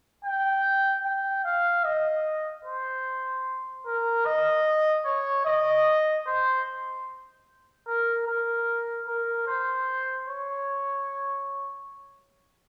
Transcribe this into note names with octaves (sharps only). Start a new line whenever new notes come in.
G5
G5
F5
D#5
C5
A#4
D#5
C#5
D#5
C5
A#4
A#4
A#4
C5
C#5